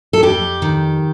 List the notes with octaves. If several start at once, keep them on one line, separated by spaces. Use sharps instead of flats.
A4
F2 G4
D#3